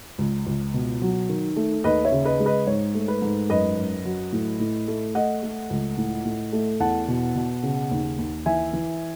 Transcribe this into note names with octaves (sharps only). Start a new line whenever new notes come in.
C#2
C#2
B2
F#3
D#3
A3
D#2 B4 D#5
C#5 E5
C#3
B4 D#5
G#3
B4 D#5
G#2 C#5
A3
B4
G#2
F#2 B4 D#5
F#2
F#3
A2
A2
A3
A3 D#5 F#5
A3
C#2
A2
A2
A3
E2 F#5 A5
B2
B2
C#3
D#2
D#2
E3 E5 G#5
E3